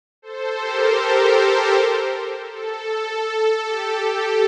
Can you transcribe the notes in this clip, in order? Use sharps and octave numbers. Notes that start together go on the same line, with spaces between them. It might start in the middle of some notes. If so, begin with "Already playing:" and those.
A4 C5
G4 A#4
A4
A4
A4
G4
A4